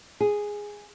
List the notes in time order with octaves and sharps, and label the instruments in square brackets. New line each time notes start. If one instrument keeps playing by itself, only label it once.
[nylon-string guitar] G#4